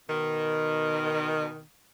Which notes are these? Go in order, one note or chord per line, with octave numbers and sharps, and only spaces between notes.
B2 D#3